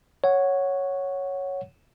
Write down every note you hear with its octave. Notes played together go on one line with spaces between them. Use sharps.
C#5 F#5